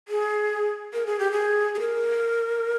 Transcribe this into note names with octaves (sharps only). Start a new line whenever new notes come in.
G#4
A#4
G#4
G4
G#4
G#4
A#4